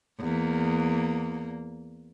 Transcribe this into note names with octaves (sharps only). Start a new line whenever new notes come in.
E2 A#3